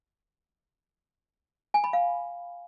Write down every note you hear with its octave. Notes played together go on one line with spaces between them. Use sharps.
G#5
B5
F5